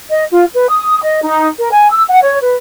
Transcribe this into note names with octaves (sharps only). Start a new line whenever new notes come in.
D#5
F4
B4
D#6
D#5
D#4
A#4
G#5
E6
F#5
C#5
B4